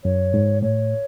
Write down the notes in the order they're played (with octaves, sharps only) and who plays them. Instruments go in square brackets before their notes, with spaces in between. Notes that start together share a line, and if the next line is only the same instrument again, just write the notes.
[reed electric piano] F#2 [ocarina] C#5
[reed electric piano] G#2
[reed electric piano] A2 [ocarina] C#5